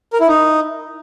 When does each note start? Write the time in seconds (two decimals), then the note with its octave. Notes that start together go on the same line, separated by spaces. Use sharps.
0.13 A#4
0.20 E4
0.28 D#4